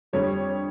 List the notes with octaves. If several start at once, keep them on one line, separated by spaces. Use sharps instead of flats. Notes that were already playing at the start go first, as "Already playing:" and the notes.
F2 D3 G3 C#5